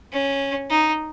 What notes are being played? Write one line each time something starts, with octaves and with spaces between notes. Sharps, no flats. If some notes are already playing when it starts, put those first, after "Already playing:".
C#4
D#4